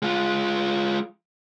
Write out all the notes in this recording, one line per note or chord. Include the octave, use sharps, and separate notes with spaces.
G#3 F4